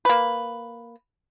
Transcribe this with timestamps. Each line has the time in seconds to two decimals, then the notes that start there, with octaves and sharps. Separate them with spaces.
0.05 A#3 B4